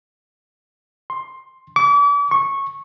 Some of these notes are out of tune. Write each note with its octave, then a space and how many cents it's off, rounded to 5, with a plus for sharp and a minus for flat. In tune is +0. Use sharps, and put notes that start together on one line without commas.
C6 +15
D6 -40
C#6 -15